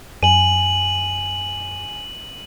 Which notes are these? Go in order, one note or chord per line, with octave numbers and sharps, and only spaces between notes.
F#2 G#5 D#7 F#7